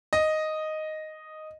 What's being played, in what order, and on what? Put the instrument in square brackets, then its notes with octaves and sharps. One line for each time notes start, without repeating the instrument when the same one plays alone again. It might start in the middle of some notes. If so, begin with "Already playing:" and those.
[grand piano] D#5